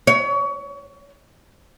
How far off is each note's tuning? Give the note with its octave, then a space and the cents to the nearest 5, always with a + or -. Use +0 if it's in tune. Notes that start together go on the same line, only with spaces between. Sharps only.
C#5 +30